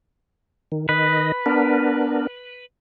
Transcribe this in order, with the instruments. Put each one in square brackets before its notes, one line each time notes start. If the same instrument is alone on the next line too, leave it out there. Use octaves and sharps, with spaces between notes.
[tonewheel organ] D#3
[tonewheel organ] D#3 D#5 [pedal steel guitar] B4
[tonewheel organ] B3 D4 A#4